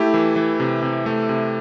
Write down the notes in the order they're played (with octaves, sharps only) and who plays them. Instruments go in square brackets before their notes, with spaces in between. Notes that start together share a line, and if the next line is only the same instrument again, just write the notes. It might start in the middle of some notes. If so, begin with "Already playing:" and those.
Already playing: [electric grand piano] A3 E4 G4
E3
E3
C3
C3
A3
C3